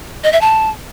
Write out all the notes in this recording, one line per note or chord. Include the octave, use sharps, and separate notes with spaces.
D#5
E5
A5